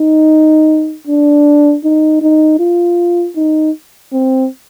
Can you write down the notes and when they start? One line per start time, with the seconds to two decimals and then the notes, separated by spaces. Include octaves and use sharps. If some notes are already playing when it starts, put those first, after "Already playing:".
Already playing: D#4
1.08 D4
1.84 D#4
2.22 D#4
2.60 F4
3.37 D#4
4.13 C4